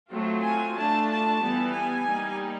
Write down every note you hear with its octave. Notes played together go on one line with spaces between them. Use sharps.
F#3 A3 C4 F4
G#5
A3 D4 F4 A5
A5
E3 G3 B3
G#5
G3 A#3 D#4